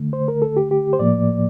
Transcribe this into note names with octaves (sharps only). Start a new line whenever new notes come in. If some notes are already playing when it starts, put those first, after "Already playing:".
Already playing: D3 A3
C5
A#4
A4
G4
G4
C5
A2 F3 A#3 D5